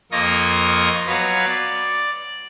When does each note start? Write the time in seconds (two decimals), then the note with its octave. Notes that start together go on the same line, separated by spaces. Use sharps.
0.12 F2 A#3 F4 D#5 C#6 A#6
1.07 F#3 B3 B4 C#5 F5
1.46 D5